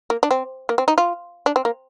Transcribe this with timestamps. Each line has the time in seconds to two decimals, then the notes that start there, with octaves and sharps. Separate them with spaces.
0.10 A#3
0.23 D4
0.31 C4
0.69 A#3
0.78 C4
0.88 D#4
0.98 F4
1.46 D4
1.56 C4
1.65 A#3